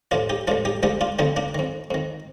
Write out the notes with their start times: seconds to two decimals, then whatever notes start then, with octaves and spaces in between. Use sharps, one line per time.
0.11 A1 A2 F3 D4 F4
0.30 D#4 G4
0.47 A1 A2 F3 D4 F4
0.65 D#4 G4
0.83 D2 D3 F3 D#4 G4
1.01 D4 F4
1.19 D2 D3 F3 C4 D#4
1.36 A#3 D4
1.55 F2 D#3
1.91 F2 D#3